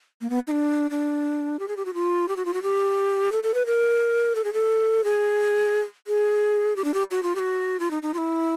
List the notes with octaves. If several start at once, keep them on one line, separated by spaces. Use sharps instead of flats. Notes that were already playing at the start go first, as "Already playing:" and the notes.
A#3
B3
D#4
D4
D4
G4
G#4
G4
F#4
F4
G4
F#4
F4
F#4
G4
A4
A4
B4
A#4
A4
G#4
A4
G#4
G#4
G4
D4
G4
F#4
F4
G4
F#4
F4
D#4
D#4
F4
E4